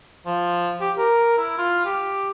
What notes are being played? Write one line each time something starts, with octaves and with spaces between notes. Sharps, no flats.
F3
G4
A#4
E4
F4
G4